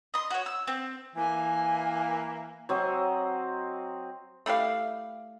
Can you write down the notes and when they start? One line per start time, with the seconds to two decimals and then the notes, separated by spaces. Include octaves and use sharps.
0.14 D#5 C6
0.30 F#4 C#5
0.46 E6
0.67 C4
1.16 E3 A#3 G#5
2.69 F#3 C4 D#5
4.46 A3 E4 G4 F5